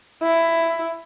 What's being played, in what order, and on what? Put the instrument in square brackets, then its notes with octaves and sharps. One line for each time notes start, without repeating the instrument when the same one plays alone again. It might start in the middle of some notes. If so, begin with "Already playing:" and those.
[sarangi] E4